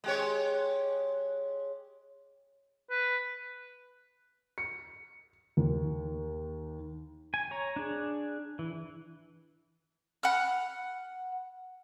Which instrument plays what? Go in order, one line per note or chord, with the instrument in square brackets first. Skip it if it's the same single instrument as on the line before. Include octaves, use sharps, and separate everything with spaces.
[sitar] G#3 G4 C#5
[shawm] B4
[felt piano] C#7
D#2
[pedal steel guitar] G#5
C#5 A#5
D4 G#4
E3
[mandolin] F#5 B5 F6